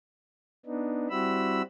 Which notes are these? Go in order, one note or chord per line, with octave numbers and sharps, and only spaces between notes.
B3 D4 D#4
G3 C4 E4 F#4 B5 E6